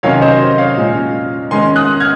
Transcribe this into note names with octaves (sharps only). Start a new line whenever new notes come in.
C3 D#3 F#3 C#4 C#5 F5
C5 D#5
C#5 F5
A#2 G#3 C#4
D#3 G#3 C#4 G#5 C6
D#6 F#6
F6 G#6